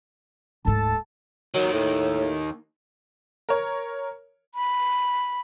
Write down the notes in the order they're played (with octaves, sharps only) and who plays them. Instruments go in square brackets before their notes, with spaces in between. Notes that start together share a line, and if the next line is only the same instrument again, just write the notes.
[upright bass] D1 G#2 [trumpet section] A4 A5
[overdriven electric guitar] D#2 D#3 [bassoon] F#3
[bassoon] A2
[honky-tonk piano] A#4 C#5
[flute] B5